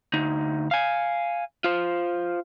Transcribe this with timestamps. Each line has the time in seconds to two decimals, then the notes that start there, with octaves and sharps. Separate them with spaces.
0.13 D2 D#4
0.71 F5 G#5
1.64 F4 C5